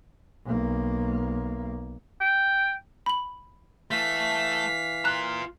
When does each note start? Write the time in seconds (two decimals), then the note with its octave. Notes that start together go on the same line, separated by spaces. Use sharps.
0.46 B1 A#3
2.21 G5
3.06 B5 F#7
3.91 E3 A3 F5 B6
5.05 F4 A#5 F#6